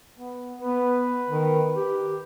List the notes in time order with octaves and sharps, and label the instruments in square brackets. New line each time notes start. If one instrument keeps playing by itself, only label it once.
[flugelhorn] B3
[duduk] B3 [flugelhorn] B4
[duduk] D#3
G4